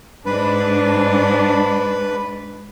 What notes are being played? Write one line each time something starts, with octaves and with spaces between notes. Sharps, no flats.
G#2 D4 B4